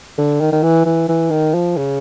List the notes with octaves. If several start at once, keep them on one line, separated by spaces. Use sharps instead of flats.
D3
D#3
D#3
E3
E3
E3
D#3
F3
C#3